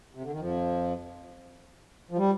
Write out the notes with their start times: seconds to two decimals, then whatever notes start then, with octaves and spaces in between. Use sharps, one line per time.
0.14 C3
0.23 D3
0.32 D#3
0.40 F2 F3
2.11 F3
2.18 G3